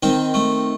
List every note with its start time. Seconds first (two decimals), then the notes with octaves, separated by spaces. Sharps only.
0.03 D#3 C4
0.34 A3